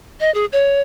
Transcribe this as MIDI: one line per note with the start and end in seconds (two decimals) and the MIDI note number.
0.20 0.33 75
0.34 0.45 68
0.52 0.81 73